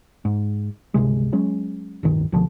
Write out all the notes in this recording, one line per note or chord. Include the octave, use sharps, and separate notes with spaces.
G#2
G1 C#2 C3 G#3
F#3 G#3 C#4
D1 C2 G2 D#3
C#2 B2 D3 F3